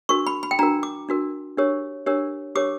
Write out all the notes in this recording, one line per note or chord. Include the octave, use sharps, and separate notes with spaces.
D4 F#4 A#4 C#6
B5
B5
G5
D4 F#4 A#4 A#5
D6
D4 F#4 A#4
D4 G4 A#4 C#5
D4 G4 A#4 C#5
D4 G4 A#4 C#5 D6